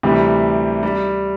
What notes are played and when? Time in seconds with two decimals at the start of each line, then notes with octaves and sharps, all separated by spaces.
0.03 D2 C3 E3 G3
0.83 G3